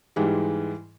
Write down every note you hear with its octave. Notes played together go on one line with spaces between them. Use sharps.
G#2 E3 G3 G#3